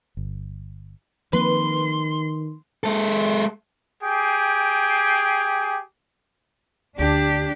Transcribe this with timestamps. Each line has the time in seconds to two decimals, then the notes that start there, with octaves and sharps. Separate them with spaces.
0.17 G1
1.33 D#3 F3 A#3 C4 B4 C6
2.84 G#3 A4
4.02 G4 G#4 G5
6.99 D2 D4 G4